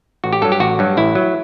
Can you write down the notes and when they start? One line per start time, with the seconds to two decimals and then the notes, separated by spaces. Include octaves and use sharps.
0.24 A1 F#4
0.33 G4
0.42 G2 F#3 A4
0.52 G4
0.60 A1 F#4
0.79 G2 F#3
0.97 A1 E4
1.15 F#3